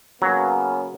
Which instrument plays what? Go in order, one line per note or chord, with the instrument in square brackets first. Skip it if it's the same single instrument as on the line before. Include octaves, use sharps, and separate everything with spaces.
[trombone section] C#3 A#3 B3 [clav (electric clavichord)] F#3